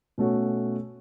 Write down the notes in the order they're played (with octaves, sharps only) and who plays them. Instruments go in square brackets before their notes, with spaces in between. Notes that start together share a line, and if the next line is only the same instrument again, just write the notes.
[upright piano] B2 A3 C#4 F#4